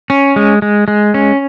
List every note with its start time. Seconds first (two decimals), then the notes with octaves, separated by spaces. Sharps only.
0.10 C#4
0.36 G#3
0.62 G#3
0.88 G#3
1.14 C#4